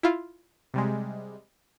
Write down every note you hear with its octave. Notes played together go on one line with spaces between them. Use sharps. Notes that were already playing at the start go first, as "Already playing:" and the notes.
E4 F4
C3 G3 G#3